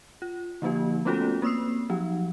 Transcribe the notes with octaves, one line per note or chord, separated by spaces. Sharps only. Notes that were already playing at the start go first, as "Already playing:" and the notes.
F4
D3 F3 A#3 D#4 G4
A3 B3 C#4 F4 F#4 A4
A#3 C4 D#6 E6 C7
F3 F#3 D#4